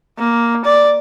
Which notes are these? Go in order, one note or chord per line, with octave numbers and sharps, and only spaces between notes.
A#3
D5